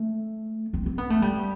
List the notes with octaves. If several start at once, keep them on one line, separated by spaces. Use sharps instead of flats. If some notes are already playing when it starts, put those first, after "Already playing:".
Already playing: A3
C4
C4
B3
A3
G3